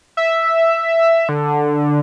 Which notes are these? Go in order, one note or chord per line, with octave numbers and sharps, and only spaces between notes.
E5
D3